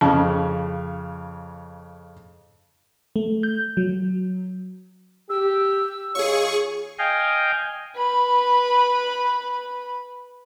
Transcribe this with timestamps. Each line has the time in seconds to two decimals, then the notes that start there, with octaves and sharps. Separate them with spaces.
0.01 F2 C#3 A5
3.16 A3
3.43 G6
3.77 F#3
5.30 G4 E6
6.15 D#2 F4 G#4 C#5 C#6
6.99 D#5 F5 G5 G#5
7.96 B4 B5